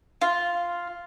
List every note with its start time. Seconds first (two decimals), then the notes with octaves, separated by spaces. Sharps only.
0.21 F4